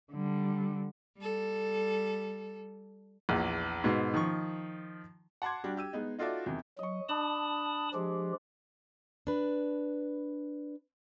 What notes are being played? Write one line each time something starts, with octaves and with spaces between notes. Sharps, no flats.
D3 G3
G3 A4
A#1 E2
G#2 B2
D#3 F3 C#6
F#5 A5 C6 D6 G#6
G3 D4 F#4
G4 E6 D#7
G#3 B3 D#4
D#4 F4 F#4 A4 D5 E5
E2 C3 D#3
F#3 D#5 C#6
D4 A5 B5 D#6
F3 G#3 G4
D4 B4